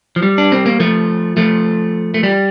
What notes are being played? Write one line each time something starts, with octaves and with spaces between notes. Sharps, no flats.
F3
G3
D4
C4
A#3
F3 A3
F3 A3
A3
G3